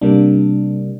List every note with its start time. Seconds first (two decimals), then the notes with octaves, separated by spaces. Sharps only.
0.01 C3 G3 A#3 D4